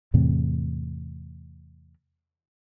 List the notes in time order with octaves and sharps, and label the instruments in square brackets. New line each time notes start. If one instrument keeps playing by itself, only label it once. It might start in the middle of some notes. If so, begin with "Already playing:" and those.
[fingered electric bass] E2 A2 C3